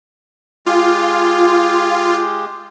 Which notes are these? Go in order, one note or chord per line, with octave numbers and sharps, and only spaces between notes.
G#3 F4 G4